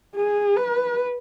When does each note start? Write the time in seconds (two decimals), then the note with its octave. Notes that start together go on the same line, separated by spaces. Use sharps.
0.16 G#4
0.57 B4